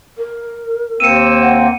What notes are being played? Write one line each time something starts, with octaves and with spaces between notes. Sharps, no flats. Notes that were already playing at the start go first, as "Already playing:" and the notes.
A#4
D#2 A#3 C4 E6 C#7 D#7
F#5